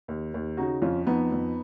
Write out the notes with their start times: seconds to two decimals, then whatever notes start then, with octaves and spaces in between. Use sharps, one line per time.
0.08 D#2
0.34 D#2
0.57 C#3 D#4 F#4
0.82 F2 C#4 F4
1.07 F2 B3 D#4
1.32 F2